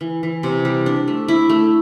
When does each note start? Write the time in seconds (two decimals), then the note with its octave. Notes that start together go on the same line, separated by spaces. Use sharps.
0.01 E3
0.23 E3
0.43 C3
0.65 G3
0.86 D4
1.08 A3
1.28 E4
1.49 A3